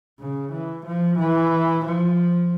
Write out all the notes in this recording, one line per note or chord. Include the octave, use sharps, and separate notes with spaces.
C#3
E3
F3
E3
F3